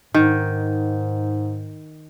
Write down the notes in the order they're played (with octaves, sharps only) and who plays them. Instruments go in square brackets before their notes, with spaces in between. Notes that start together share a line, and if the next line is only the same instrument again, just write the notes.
[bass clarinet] G#2 [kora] D#3